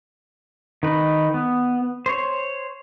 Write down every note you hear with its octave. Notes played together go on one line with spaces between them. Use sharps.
D#3 D#4 B4
B3
C5 C#5